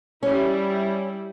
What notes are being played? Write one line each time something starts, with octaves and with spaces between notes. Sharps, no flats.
G3 C#4 E4